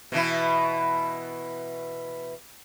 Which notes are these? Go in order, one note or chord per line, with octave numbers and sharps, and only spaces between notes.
B2 E3 E4